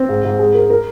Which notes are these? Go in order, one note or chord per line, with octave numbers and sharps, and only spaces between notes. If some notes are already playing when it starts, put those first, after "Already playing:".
Already playing: C4
G#2
G#2
G#3
A#4
A#4